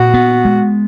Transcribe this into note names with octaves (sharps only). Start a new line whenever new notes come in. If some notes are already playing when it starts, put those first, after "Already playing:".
Already playing: A#2 F#4
B3
G#3